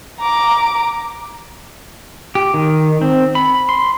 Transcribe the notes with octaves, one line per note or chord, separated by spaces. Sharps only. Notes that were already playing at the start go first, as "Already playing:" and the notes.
A#5 D6
G4
D#3
C4
B5
C6